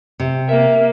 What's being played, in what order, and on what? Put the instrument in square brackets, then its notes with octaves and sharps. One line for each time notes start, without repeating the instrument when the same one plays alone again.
[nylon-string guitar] C3
[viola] A#3 [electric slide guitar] E5